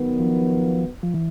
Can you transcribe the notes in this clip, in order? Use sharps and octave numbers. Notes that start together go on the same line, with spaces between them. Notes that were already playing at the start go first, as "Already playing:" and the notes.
Already playing: D#3 F#3 B3
F3
F3
E3